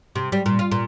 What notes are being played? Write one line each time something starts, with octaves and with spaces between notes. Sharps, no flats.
C3
G3
A#2
F4
A#2